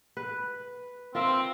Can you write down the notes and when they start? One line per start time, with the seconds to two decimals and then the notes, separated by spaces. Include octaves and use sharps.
0.17 B4
1.15 C4 F4 A#4 E5